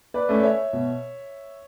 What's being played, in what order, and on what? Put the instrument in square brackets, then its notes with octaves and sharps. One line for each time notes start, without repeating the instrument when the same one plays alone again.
[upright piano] B4 D5
[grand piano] A3 C#4
[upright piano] D5
C#5 E5
[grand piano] B2